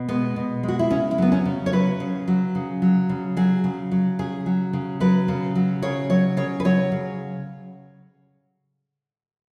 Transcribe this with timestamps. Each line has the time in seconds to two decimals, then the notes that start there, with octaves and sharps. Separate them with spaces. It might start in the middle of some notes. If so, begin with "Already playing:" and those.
Already playing: B2
0.08 G#3 B3
0.36 B2
0.63 G#3
0.68 F#4
0.79 E4
0.90 C#3 C#4
1.11 E4
1.18 F#3 B3
1.32 C#4
1.45 C#3
1.66 C#5
1.73 F#3 B4
2.00 C#3
2.28 F#3
2.55 C#3
2.82 F#3
3.09 C#3
3.37 F#3 G#4
3.64 C#3
3.91 F#3
4.19 C#3 G#4
4.46 F#3
4.73 C#3
5.00 F#3 B4
5.28 C#3
5.55 F#3
5.82 C#3 C#5
6.10 F#3 C#5
6.37 C#3 C#5
6.60 B4
6.65 F#3 C#5
6.92 C#3